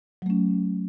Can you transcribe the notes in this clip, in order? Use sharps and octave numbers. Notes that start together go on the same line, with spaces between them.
F#3 A3 C#4